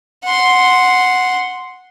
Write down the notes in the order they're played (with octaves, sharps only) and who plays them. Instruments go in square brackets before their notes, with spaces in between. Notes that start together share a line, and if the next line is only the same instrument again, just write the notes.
[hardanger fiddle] F#5 C6